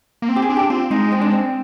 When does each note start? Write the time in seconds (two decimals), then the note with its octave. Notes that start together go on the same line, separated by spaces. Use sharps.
0.22 A#3
0.29 C4
0.36 G4
0.42 G#4
0.49 D4
0.56 G4
0.70 C4 F4
0.91 G#3 D#4
1.12 C4
1.21 D4
1.32 C4